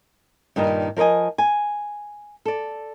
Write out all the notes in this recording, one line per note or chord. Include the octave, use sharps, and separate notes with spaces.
G2 A#2 D#3 G3 D#4
F3 A#4 C#5 D#5 G#5
G#5
A4 D5